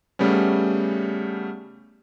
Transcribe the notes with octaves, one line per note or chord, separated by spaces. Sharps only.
C#3 G3 A3 B3 C#4